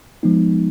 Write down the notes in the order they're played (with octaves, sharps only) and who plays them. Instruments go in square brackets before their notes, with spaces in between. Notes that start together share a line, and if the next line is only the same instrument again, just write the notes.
[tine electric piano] F3 G#3 B3 D#4